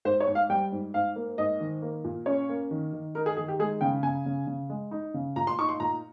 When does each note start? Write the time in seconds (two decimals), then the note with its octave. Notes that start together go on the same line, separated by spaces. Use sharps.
0.05 G#2 C5
0.20 C#5
0.27 G#2
0.35 F5
0.50 G3 G5
0.72 G#2
0.94 G#2 F5
1.16 A#3
1.38 G#2 D#5
1.60 D#3
1.82 A#3
2.04 A#2
2.26 C#4 C#5
2.49 A#3
2.71 D#3
2.93 D#3
3.15 D#4 A#4
3.26 G#4
3.37 D#3 G#4
3.48 G4
3.59 G#3 G#4
3.81 C#3 G5
4.03 C#3 G#5
4.26 C#3
4.47 C#3
4.70 G#3
4.91 D#4
5.14 C#3
5.36 A#2 A#5
5.47 C6
5.58 D#4 C#6
5.69 C6
5.80 A#2 A#5